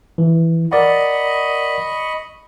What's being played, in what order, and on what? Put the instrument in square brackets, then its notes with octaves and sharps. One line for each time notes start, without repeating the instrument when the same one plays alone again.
[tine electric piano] E3
[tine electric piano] A#4 D5 F#5 [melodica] D#5 B5 C#6